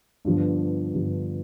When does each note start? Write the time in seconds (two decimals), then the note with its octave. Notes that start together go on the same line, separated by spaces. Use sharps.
0.25 G2 D3 F3 B3
0.94 G2 D3 F3 B3